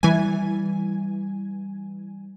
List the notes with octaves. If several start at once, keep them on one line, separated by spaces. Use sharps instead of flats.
E3 G3 G#5